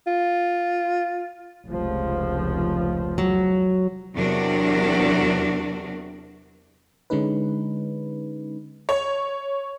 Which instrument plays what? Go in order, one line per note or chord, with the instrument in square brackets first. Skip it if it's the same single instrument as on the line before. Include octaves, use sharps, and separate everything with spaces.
[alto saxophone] F4
[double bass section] F1 C#2 F3
[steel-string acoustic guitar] F#3
[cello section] E2 C3 F#3 D4 F#4 A#4
[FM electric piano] D3 G#3 C#4 D#4 B4
[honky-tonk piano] C#5